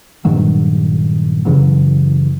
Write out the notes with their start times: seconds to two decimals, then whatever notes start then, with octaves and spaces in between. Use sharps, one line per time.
0.25 G2 A#2 D#3 F#3
1.45 F#2 C#3 E3 F#3